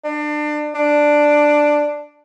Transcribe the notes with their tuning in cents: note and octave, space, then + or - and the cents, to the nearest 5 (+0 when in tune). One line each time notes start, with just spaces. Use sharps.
D4 +30
D4 +5